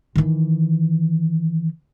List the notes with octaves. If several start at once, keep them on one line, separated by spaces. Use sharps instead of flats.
D#3 E3